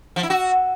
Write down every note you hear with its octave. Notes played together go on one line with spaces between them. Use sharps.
F3
E4
F#4